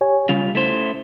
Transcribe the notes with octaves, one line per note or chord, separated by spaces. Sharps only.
G4 C#5 G#5
C#3 G3 C#4 F4
A3 E4 C5